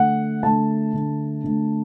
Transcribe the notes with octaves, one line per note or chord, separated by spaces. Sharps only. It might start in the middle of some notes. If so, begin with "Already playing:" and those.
Already playing: D3 A3 F#5
D3 A3 A5
D3 A3
D3 A3